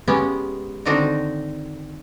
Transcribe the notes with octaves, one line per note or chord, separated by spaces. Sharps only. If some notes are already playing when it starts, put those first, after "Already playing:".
G#3 B3 C#4 G4
D3 D#3 C4 D4 D#4 F#4